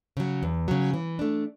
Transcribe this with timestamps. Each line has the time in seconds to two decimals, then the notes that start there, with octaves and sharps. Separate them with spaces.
0.17 C#3 F#3
0.43 E2
0.68 C#3 F#3
0.94 E3
1.19 A3 D4